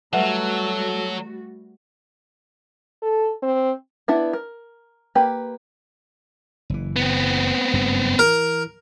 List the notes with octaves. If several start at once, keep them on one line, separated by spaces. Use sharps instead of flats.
F#3 G3 A3 F#4 A4 B4 E5 F#5
A4
C4
B3 D4 E4 F#5
A#4
A#3 G4 B4
F#1 E3
B3 C4
F#1 G2 F#3
E3 A#4